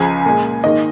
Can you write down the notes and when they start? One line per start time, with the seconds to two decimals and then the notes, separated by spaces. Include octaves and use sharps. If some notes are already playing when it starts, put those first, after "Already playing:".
Already playing: C#2 C#3 F3 G#5
0.26 A#2 G#3
0.63 G#2 D#3 A#3 D#5